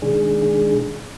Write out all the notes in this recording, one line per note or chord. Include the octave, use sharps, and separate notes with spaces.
B2 D#3 G#3 D4 G#4